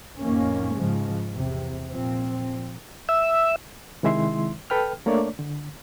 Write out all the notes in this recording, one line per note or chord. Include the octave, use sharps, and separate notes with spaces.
F2 A2 D#3 A#3 C#4
G#2 C#3 F3 G#3
E2 C3
A#2 F3 C4
E5 E6
C3 D#3 G#3 E4 E5 C6
A4 B4 G5 F6
A3 A#3 D4 C#5 D5
D3